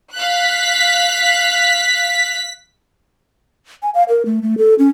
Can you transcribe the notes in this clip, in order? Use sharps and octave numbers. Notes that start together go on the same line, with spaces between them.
F5 F#6 B6
G#5
F5
A#4
A3
A3
A4
C#4